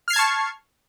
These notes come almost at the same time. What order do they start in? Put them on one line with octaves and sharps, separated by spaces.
F6 C7 G#6 A5 C#6